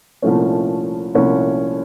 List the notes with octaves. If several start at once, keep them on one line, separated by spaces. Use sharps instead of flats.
C2 A#2 F3 A3 C#4
C2 A#2 F3 A3 C#4